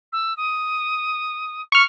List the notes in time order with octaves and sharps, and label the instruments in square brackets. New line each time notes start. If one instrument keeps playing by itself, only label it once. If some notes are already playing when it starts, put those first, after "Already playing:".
[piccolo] E6
D#6
[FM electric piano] C#6 F6 [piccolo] C#7